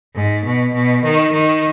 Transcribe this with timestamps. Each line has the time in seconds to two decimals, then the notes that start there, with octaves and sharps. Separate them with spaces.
0.15 G#2
0.44 B2
0.73 B2
1.03 D#3
1.32 D#3